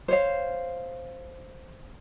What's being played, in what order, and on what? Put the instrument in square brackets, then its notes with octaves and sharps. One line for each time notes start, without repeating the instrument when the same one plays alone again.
[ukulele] C5 C#5 F5